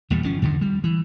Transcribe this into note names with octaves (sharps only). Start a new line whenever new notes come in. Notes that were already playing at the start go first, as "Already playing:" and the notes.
D#1 E2 A#2 G3
G1 F3 C#4
E2 G2 D3 D#3
G3
E3